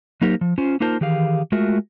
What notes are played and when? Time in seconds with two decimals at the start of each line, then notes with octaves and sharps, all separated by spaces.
0.22 F#3 A#3 D#4 G4 A#4 C5
0.41 F3
0.58 C#4 F4 C5
0.80 A#3 D#4 F4 A#4 C5 A5
1.01 D#3 E3 G4 G#4 F5
1.52 G#3 A3 F4 F#4 A#4 E5